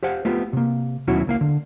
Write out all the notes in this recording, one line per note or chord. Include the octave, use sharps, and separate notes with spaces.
G4 C5 F5 F#5
A3 B3 F4 G4
C3 A#3
D#2 B2 F#3 C#4 E4 F#4
C#2 A#3 F5
D3